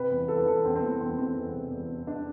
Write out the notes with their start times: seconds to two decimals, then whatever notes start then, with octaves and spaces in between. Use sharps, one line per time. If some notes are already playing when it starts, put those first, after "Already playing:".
Already playing: C3 B4
0.11 E2
0.28 E3 A4
0.38 B4
0.46 E3 A4
0.65 E2 C4
0.76 C4
0.82 E3 B3
1.01 E2 C4
1.18 E3 C4
1.36 E2
1.54 C3
1.71 E2
1.89 E2
2.07 D4